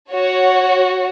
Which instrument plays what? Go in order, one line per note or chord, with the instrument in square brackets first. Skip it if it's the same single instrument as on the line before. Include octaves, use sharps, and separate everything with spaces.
[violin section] F#4 C#5